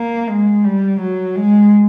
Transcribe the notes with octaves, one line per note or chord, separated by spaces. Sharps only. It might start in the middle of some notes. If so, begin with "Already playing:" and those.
Already playing: A#3
G#3
G3
F#3
G#3